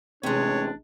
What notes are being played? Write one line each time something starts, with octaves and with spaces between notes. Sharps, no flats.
A1 C3 G#3 D4 C#5